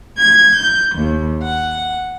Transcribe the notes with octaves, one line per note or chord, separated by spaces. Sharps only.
G#6
G6
D#2
F#5